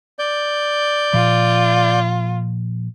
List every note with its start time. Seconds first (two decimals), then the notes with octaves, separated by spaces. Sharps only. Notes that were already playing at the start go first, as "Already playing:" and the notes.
0.19 D5 G6
1.13 A#2 F3 F4